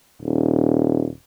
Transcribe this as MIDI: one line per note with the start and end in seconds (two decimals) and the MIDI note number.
0.22 1.08 27